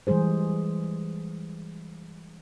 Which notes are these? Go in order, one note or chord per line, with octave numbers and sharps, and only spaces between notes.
E3 G3 G#3 G#4 C5